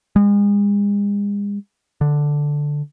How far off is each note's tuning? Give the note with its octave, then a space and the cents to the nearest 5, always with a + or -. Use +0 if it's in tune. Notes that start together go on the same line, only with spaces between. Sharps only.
G#3 -40
D3 +0